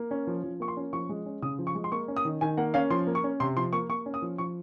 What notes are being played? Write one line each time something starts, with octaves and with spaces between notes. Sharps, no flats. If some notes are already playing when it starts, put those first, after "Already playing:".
Already playing: A#3
C#4
F3
F3
A#3 C#6
C6
C#4
F3 C#6
G#3
C#4
C#3 D#6
F3
C#6
G#3
C6
A#3 C#6
C#4
D#6
D#3
D#3 G#5
A#3 F#5
C#4 F5
F3 C6
A#3
C#6
C#4
C3 C6
F3 C6
A#3 C#6
A#3 C#6
C#4
D#6
F3
F3 C#6